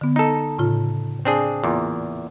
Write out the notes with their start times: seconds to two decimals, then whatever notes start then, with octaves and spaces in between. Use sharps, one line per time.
0.01 D3 B3
0.16 D#4 A4
0.58 A2 C#3 F4
1.25 C4 D4 G#4
1.63 E2 A#2